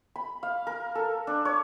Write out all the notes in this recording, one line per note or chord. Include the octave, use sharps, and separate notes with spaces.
B5
F5
A#4
A4
D4
C#5